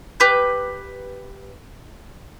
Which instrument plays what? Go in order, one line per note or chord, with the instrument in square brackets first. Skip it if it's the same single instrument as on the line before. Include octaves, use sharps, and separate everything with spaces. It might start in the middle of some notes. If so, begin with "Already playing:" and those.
[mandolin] G4 B4 G6